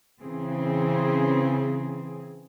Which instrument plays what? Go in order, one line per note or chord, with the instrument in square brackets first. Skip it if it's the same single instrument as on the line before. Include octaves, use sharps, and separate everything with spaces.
[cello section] C#3 E3 C4 G#4